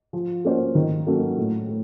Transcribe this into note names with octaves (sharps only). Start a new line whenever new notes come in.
F3
A#3 C#4 F#4 C5
D#3
F#3 A#3 C#4 A4
A2
A3